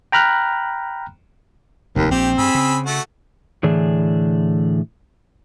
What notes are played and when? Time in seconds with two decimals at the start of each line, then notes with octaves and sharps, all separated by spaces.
0.12 G5 A#5 B5 F6 F#6
1.96 F1 D#2
2.11 A#1 C4 G4
2.38 G2 G#4 B5 E6
2.55 C#3
2.86 A3 F#4 F#5
3.63 A2 D3 E3 D4 G#4